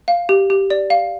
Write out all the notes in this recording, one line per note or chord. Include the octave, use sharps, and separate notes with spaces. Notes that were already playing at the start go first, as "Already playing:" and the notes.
F5
G4
G4
D5
F5